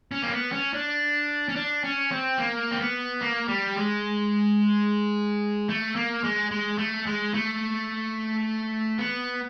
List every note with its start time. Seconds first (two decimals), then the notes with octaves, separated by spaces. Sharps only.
0.11 C#4
0.22 A#3
0.32 B3
0.52 C#4
0.73 D4
1.49 C#4
1.56 D4
1.84 C#4
2.11 C4
2.38 A#3
2.71 C4
2.79 B3
3.21 A#3
3.48 G3
3.76 G#3
5.69 A3
5.96 A#3
6.24 G#3
6.51 G#3
6.78 A3
7.06 G#3
7.34 A3
8.99 B3